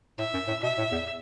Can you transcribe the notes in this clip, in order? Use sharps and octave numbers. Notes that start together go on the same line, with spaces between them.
A2 E5
F#2
A2
B2 E5
A2
E2